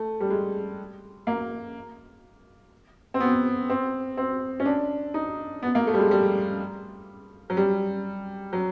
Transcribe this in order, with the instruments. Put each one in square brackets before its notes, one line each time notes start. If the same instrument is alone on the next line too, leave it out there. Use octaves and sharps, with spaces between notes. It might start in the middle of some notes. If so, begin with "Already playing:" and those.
Already playing: [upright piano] A3
G3
G#3
A#3
C4
B3
C4
C4
C#4
D4
D#4
B3
A#3
A3
G3
G#3
G3
F#3
G3
F#3